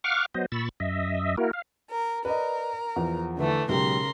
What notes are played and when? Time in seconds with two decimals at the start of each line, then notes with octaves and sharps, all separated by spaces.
0.04 F5 F#5 C#6 D6 F6
0.34 F#3 B3 C5 D#5
0.52 A#2 B5 C#6 E6 A6
0.80 F#2 D#5 E5
1.37 A#3 E4 F#4 A#4
1.53 F5
1.90 A#4
2.25 A#4 B4 D5 D#5
2.96 E2 F3
3.38 D3 E3 A3
3.69 B1 C#3 G#3 G4 A#4 C6